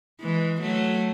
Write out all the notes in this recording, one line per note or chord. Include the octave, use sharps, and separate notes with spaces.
E3 G#3
F#3 A3